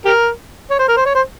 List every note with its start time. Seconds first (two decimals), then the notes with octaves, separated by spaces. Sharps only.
0.05 G4 A#4
0.71 C#5
0.79 C5
0.88 A#4
0.97 C5
1.06 C#5
1.15 C5